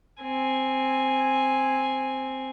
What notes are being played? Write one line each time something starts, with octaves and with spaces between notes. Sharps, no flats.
C4 G#5